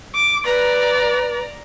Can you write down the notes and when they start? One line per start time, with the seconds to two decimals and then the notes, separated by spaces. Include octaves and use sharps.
0.15 D6
0.46 B4 D5 A#5